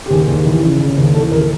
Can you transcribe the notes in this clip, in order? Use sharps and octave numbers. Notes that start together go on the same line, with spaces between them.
G4
D#2 G#4
D#2
E3
C#3
C#3
D#2
E3 A4
D#2 A#4